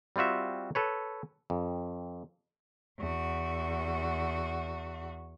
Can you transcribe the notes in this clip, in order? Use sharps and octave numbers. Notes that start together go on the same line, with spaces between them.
G3 C4 F4 F#4 E5
A4 B4 C#5
F2
E2 F#4